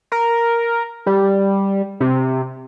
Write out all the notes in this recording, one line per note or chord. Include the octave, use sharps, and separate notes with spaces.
A#4
G3
C3